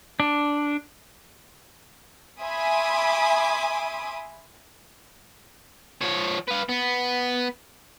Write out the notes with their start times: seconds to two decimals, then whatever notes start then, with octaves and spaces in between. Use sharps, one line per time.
0.20 D4
2.41 E5 G#5 B5 C6 D6 D#6
6.01 F3 C#5
6.48 B4 F5
6.69 B3